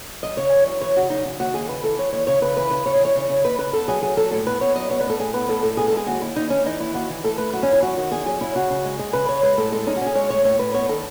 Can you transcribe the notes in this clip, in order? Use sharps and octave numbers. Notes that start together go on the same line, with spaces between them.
F#2 D#5
C#3 C#5
E3
F#2
E3 C#5
C#3 F#4
F#2 D#4
C#3
D#2 F#4
D#2 G#4
C#3 B4
E3 A4
E3 C#5
D#2 C#5
C#3 C#5
C#3 B4
E3 B4
C#3 B4
C#3 C#5
D#5
E3 C#5
C#3
C#3
D#2 B4
C#3 B4
B3 A4
F#3 G#4
F#3 G#4
F#3 A4
A2 A4
B3 B4
B3 C#5
F#3 D#5
B3 C#5
B4
A2 A4
A2 G#4
B3 B4
A2 A4
A2 A4
B3 G#4
A4
G#3 G#4
D#2 F#4
D#2 E4
D#2 D#4
E3 C#4
E3 D#4
D#2 E4
D#2 F#4
E3
A3 A4
A3 B4
F#3 F#4
C#4
E2 E4
F#3 F#4
D#3 F#4
E2 G#4
F#3 G#4
C#4 E4
C#3 F#4
C#3
G#3
G#3 G#4
C#3 B4
C#3 C#5
G#3 B4
A2 A4
G#3 A4
C#4 D#4
F#4
C#4
G#4
G#3 C#5
A2 C#5
A2 C#5
A2 B4
B3 C#5
D#3 A4